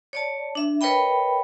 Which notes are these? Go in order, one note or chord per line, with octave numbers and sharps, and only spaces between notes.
C#5 D5 A5
D4 E5
A#4 B4 C#5 D#5 G5 B5